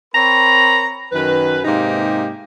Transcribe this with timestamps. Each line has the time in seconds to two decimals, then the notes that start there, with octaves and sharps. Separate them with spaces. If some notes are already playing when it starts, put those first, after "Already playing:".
0.14 C4 A#4 C#5 A#5 B5
1.12 F#2 D#3 B4
1.65 G#2 C3 A#3 D#4 G4